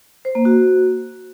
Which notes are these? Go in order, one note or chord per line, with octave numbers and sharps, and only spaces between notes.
C5
A#3
F#4